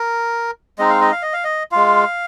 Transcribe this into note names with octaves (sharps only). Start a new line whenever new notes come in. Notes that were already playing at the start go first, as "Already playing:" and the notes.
Already playing: A#4
G#3 C4 D#4 D#5
F5
D#5
F5
D#5
F5
D#5
G#3 F4 F5